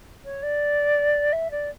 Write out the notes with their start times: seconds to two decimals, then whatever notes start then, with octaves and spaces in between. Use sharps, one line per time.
0.24 C#5
0.42 D5
1.32 E5
1.51 D5